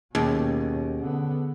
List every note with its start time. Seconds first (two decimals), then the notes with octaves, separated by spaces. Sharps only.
0.15 D#2 B2 C#4 G#4
0.99 D3 B3